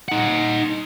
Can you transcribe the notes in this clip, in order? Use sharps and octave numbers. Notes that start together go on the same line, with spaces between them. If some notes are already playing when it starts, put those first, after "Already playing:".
D#4 F#5